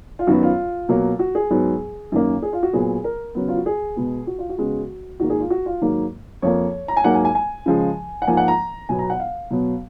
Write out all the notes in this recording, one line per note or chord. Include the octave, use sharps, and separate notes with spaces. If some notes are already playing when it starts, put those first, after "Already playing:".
F4
F#2 D#3 F#3 B3 F#4
F4
B2 F#3 A#3
F#4
G#4
G#2 F#3 B3 G#4
F#2 D#3 A#3
G#4
F4
F#4
A#2 F#3 B3 G#4
A#4
C#3 F#3 B3
F4
F#4
G#4
B2 G#3 B3
F#4
F4
F#4
C#3 G#3 B3
G#2 D#3 A#3 F#4
G#4
F4
F#4
F4
G#2 D#3 F#3 A#3
F2 F3 A#3 C#5
A#5
G#5
G#2 F#3 A#3 F#5
G#5
G#5
G#5
C#3 F3 G#3
F#5
G#2 F3 A#3 G#5
F#5
A#5
B2 F#3 B3 G#5
A#5
F#5
F5
B2 F#3 B3